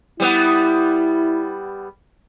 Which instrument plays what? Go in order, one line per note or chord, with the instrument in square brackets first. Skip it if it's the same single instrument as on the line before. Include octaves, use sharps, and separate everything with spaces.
[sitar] G3 B3 [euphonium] E4